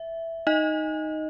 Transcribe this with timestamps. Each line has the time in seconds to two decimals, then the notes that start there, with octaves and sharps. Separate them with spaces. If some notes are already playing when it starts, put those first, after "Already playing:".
Already playing: E5
0.47 D#4 D#5